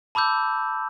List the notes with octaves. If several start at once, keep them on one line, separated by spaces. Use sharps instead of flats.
A5 B5 D6 E6 G6